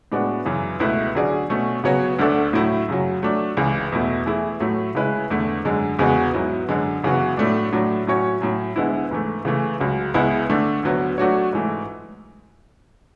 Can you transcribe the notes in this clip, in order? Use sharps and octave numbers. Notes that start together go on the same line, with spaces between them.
A2 G#3 B3 D4 F#4
F#2 C#3 E3
C#2 B2 A3 E4 B4
D3 F#3 C#4 G#4 D5
B2 A3 C#4
C#3 F#3 B3 F#4 C#5
D2 D3 A3 D4 A4
A2 F#3 A3 E4
F#2 C#3 F#3
F#3 A3 D4
C#2 C#3 E3
E2 B2 A3 E4
E3 A3 E4 G#4
A2 F#3 A3
C#3 G#3 C#4 E4 B4
E2 D3 A3
F#2 D3 G#3
E2 C#3 G#3 B3 F#4
G#2 F#3 B3 E4
F#2 D3 G#3
F#2 C#3 E3 B3 F#4
A2 F#3 A3 D4
A2 F#3 A3 D4
A2 F#3 C#4 F#4 C#5
A2 F#3 C#4
D2 D3 G#3 B3 E4
G#2 E3 A3
C#3 E3 A3
C#2 C#3 F#3
C#2 C#3 G#3 B3 E4
D3 A3 D4
D2 D3 F#3 B3
F#3 A3 D4 F#4 C#5
G#2 E3 A3